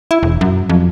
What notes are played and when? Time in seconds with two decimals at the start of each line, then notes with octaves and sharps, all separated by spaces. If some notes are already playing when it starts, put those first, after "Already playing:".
0.11 E4
0.23 E1
0.41 F#2
0.69 F2